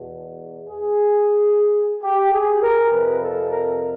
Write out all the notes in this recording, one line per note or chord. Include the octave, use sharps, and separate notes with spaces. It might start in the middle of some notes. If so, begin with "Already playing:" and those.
Already playing: E2 B2
G#4
G4
G#4
A#4
F2 C3 F3 B4
A4
A#4